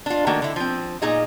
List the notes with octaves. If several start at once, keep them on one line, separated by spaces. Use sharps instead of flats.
D4 F4
D#3 A3 A#3 F#4
D3 E4
F3 C4
A#2 D#4 G#4 D#5